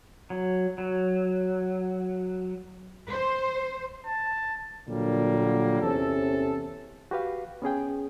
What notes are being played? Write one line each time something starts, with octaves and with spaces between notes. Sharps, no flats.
F#3
F#3
C5
A5
A#2 D3 F#3 G3 A#3
E2 C3 C#4 A4
F#4 G4 B4 F5
B3 C#4 G#4 G5